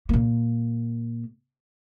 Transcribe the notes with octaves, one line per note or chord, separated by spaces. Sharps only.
A#2 A#3